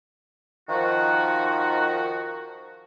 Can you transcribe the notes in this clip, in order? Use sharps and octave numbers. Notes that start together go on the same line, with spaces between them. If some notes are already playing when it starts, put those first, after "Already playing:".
D#3 F3 F#4